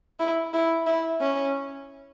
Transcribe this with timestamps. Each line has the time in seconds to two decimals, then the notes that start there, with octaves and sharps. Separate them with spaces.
0.20 E4
0.53 E4
0.87 E4
1.21 C#4